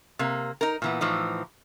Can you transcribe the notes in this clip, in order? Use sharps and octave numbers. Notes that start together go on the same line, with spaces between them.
C3 A#3
D#4 A#4
A#2 E3 B3
A2 E3 F3 D#4